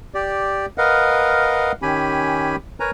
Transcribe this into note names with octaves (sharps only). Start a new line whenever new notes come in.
G4 D5
A#4 B4 D#5 F5 F#5
D#3 C#4 G4 G#5 B5
A#4 B4 C#5 G#5 A#5